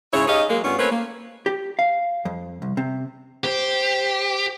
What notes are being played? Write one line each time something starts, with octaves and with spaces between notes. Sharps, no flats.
G#2 C#3 E4 C#5
D#4 G4 G#4 C#5 D#5 F5
F#3 G#3 A#3
G2 B3 C#4 F4
A3 A#3 C4 C#4 B4 C#5
A#3
G4
F5
F2
C2
C3
G4 C5